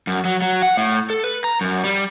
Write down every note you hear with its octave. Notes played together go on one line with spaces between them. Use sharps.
F#2
F#3
F#3
F#5
A2
A4
B4
A#5
F#2
G3